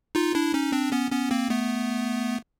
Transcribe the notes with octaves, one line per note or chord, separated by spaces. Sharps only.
D#4 F4
D4 E4
C#4 D#4
C4 D4
B3 C#4
B3 C#4
A#3 C4
A3 B3